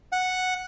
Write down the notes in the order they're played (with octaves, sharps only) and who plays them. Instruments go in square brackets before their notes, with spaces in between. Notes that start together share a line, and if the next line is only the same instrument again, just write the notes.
[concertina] F#5